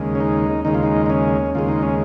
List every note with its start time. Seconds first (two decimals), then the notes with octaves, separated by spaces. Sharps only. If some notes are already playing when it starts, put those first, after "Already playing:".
Already playing: D#2 C#3 G#3
0.15 C#4
0.20 D#4
0.65 D#2 C#3 G#3 D#4
0.74 F4
0.83 D#4
1.06 D#4
1.10 C#4
1.55 D#2 C#3 G#3 F4
1.68 D#4
1.82 C#4